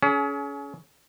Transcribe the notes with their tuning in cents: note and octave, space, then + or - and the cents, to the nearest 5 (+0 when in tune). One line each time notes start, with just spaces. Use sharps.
C#4 +25 G#4 +40